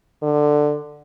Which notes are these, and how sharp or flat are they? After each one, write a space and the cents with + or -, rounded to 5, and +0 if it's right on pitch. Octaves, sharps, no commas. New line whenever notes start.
D3 +15